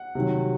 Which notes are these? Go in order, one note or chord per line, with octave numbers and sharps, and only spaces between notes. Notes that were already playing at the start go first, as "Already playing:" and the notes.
Already playing: F#5
C3 D#3 F#3